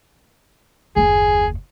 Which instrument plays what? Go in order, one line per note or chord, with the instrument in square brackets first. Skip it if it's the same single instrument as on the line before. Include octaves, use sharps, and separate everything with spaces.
[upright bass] F#1 D#2 [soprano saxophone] G#4